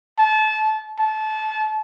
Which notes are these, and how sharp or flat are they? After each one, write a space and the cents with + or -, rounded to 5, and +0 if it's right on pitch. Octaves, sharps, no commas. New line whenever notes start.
A5 -25
A5 -25